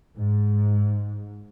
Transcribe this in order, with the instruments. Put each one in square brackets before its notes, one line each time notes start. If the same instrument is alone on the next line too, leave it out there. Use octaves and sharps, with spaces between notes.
[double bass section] G#2